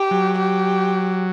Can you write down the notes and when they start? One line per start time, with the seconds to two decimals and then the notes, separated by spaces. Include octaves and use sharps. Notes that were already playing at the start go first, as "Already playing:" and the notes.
Already playing: G4
0.11 F#3
0.38 G4